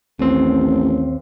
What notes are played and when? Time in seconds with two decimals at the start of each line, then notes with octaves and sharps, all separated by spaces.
0.19 A1 D#2 C4